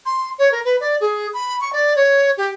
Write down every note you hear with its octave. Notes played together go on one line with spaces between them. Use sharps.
C6
C#5
A#4
B4
D5
G#4
B5
C#6
D5
C#5
G4